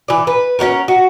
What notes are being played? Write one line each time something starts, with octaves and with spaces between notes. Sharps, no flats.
E3 D5
B4
C#4 D4 F#4 A#4
F#4